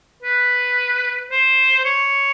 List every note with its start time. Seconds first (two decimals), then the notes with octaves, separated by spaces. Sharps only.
0.22 B4
1.31 C5
1.85 C#5